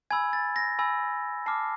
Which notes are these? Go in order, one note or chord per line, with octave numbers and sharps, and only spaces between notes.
G#5 B5 E6 G#6
A6
A#6
G#5 B5 E6
A5 D6 F6 C7